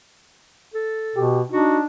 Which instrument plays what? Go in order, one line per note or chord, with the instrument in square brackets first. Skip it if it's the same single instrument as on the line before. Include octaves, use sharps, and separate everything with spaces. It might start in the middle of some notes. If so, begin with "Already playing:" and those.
[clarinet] A4
[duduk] B2 [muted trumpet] G4
[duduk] D4 [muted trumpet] D#4 [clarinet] F#4